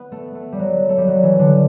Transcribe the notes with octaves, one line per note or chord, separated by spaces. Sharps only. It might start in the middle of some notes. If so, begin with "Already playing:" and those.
Already playing: B3
A3
A3
G3
F#3
A3
G3
F#3
E3
D3